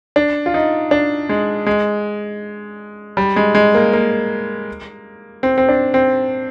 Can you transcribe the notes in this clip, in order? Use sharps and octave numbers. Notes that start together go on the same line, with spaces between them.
D4
F4
D#4
D4
G#3
G#3
G3
G#3
G#3
A#3
A#3
C4
C4
D4
C4